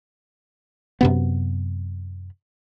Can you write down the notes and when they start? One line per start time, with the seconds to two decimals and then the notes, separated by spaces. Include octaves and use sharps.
1.01 F#2 C3 B3